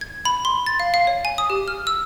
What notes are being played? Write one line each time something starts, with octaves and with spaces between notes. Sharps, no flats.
G#6
B5
C6
A6
F5
F5
C#5
G#5
D#6
G4
F6
E6